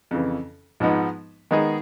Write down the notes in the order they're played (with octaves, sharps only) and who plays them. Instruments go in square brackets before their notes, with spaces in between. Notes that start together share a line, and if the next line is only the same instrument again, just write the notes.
[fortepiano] F2 C#3 E3
G#2 F3 G#3 B3 D#4
D#3 G#3 B3 D#4 G#4